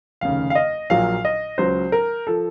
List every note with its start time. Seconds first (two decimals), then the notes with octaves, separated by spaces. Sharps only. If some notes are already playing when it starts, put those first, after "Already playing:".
0.21 F1 D#2 C#3 F5
0.50 F5
0.55 D#5
0.90 A#1 A#2 F#3 F5
1.25 D#5
1.58 C#2 C#3 F#3 C5
1.92 A#4
2.27 F3 A4